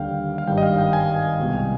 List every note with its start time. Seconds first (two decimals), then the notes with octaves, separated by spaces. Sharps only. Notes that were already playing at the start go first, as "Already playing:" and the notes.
Already playing: D#2 D3 G3 F5 G5
0.38 F5
0.47 G#1 G2 D#3 G3 G5
0.58 D#5
0.63 F5
0.78 G5
0.93 G#5
1.39 C2 B2 G#3